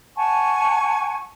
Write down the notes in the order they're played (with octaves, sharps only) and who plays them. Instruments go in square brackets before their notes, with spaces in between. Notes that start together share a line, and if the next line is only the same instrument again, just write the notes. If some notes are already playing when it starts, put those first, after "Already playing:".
[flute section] F#5 G#5 A5 C#6